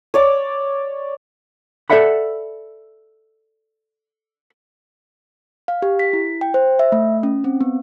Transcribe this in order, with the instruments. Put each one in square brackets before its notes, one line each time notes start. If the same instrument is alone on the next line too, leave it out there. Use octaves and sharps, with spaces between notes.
[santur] C#5 D5 D6
[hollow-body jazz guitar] A4 C5 D5 E5 F#5 B5
[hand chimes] F5
G4
B6
E4
G5
C5
E5
A3
C#4
C4
B3